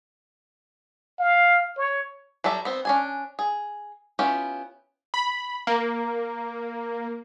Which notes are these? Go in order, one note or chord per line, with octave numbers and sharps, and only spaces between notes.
F5
C#5
F#3 G3 A4 E5
B3 C4
C#4 D4 G#5
G#4
B3 C#4 E4 F4 G4
B5
A#3